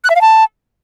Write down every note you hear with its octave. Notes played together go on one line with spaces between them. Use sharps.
F#6
E5
F5
A5